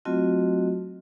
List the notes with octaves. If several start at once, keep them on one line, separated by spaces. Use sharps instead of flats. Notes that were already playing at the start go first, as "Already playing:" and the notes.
F#3 A3 C4 F4 F#4 D#5